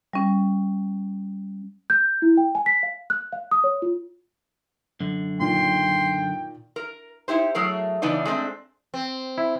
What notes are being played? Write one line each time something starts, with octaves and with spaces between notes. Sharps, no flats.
G3 C#4
G6
E4
G5
G#5
B6
F5
F#6
F5
D#6
C#5
F4
F#2 D3
A#2 D#3 G5 C6
A#4
D#4 E4 G4 C5
F#3 A3 G#4 A#4
C#3 E3 B3 D4 D#4 D5
G#3 A3 C4 D4
C4
E4